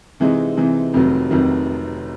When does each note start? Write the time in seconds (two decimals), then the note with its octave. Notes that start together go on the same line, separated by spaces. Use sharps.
0.20 C3 E3 G#3 C4 D#4
0.57 C3 E3 G#3 C4 D#4
0.94 F1 F2 C3 D#3 F#3
1.31 F1 F2 C3 D#3 F#3